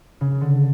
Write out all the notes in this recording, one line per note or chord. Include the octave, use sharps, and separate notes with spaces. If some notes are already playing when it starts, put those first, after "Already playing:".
C#3
D3